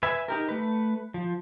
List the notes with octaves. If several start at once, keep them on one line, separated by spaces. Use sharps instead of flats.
B4 E5 G#5
D#4 G4 A#4
A3 B4
F3